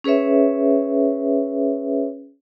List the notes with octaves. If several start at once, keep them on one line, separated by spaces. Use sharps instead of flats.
C#4 G#4 B4 C#5 E5